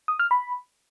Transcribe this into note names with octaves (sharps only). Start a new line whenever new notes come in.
D#6
F6
B5